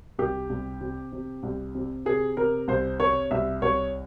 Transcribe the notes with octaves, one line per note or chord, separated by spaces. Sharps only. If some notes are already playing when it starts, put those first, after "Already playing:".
C2 G4
C2
C3
C3
C2
C3
C3 G#4
C3 A#4
C2 C5
C3 C#5
C2 E5
C2 C#5